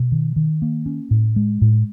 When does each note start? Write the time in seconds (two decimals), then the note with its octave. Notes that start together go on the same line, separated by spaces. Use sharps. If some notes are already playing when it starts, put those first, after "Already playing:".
Already playing: B2
0.12 D#3
0.36 D#3
0.62 A#3
0.86 C#4
1.11 A2
1.36 G#3
1.61 A2